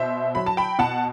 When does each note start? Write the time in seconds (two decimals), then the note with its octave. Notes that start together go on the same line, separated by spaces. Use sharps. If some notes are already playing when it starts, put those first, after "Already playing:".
Already playing: B2 C5 E5
0.35 F#3 B5
0.46 A5
0.57 G5 B5
0.79 B2 F#5 A5